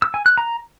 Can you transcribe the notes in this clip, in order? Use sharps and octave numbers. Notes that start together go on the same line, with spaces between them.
E6
G#5
F#6
A#5